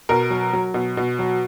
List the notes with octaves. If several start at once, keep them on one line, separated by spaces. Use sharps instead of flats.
B2 A#4
F#3
F#3
B2
B2
F#3